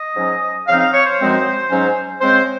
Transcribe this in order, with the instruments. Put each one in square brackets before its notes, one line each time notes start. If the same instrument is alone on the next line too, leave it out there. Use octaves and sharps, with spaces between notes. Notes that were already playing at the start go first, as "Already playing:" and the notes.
Already playing: [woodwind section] D#5
G#2 F#3 C#4
C#3 F3 C4 D#4 F5
F5
C#5
C5
F#2 F3 G#3 C4 D#4
G#2 F#3 C#4
C#3 G#3 C4 C5